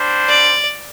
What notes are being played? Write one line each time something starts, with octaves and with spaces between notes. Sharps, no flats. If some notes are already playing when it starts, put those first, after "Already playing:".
Already playing: G3 D4 C5
D5